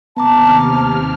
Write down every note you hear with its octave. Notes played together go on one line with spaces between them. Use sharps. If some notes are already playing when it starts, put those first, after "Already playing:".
D#2 C3 B3 A5 A#5 D6 F6